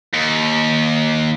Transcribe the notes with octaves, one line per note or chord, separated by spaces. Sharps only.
D#2